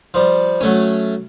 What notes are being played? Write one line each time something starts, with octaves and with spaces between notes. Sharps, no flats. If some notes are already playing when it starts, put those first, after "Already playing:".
F3 G3
F#3 A3 C#4